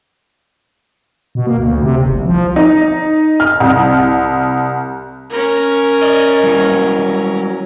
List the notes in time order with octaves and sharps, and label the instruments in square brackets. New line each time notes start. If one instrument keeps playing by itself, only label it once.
[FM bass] B2
A#3
D2
C3
F#1
C2
F3
[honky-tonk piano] D#4
F6
C2
[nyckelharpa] C#4 A#4
[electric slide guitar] D5 D#5
F#3 G3 E4